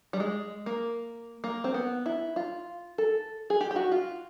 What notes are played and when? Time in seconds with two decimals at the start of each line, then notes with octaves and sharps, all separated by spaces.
0.13 G3
0.20 G#3
0.66 A#3
1.44 A#3
1.64 C4
1.74 B3
2.06 E4
2.36 F4
2.98 A4
3.50 G#4
3.61 G4
3.71 G4
3.76 F#4
3.92 F4